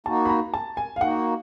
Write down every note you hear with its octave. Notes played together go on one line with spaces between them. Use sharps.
A#3 D#4 F#4 A5
B5
A#5
A5
G#5
F5
A#3 D#4 F#4 F#5